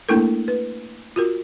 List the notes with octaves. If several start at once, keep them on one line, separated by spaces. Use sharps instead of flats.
A3 A#3 D4 E4 A4 A#4
B4
F4 F#4 A#4